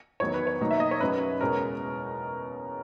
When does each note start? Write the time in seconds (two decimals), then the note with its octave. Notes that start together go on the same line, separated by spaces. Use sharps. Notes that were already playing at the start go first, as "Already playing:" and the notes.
0.20 E2 D#3 F#3 B3 C#5
0.34 B4
0.47 C#5
0.60 B2 F#3 A#3 D#4
0.71 E5
0.80 D#5
0.91 C#5
1.00 F#2 C#3 F#3 B4
1.41 E2 B2 G#3 C#4 A#4